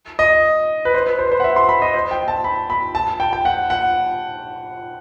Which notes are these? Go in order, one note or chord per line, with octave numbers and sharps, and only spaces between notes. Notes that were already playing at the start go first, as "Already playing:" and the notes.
D#5
B4
C5
B4
C5
B4
C5
F#5
E5
C6
B5
D#5
C5
G5
A5
B5
B5
A5
G5
G5
F#5
F#5